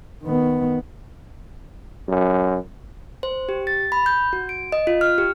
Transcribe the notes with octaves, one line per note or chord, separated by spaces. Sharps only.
D#3 B3
F#2
C5
G4
A6
B5
G6
F#4
D7
D#5
F4
F6
G4